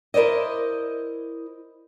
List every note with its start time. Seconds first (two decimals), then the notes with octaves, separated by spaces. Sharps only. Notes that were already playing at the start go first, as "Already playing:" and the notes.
0.14 E4 A#4 C5 D5 D#5